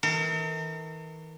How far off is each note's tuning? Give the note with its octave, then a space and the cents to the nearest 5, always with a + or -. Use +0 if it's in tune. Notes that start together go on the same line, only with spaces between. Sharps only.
E3 -40 A#4 -45